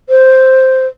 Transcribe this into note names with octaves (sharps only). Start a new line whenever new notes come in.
C5